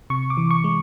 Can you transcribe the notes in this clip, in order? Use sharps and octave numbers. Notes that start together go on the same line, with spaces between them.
C3 C#6
D6
E3
C#6
G#3